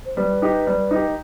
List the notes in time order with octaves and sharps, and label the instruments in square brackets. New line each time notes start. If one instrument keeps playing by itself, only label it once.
[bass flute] C5
[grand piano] G3 [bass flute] B4
[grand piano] D#4 G4
G3
D#4 G4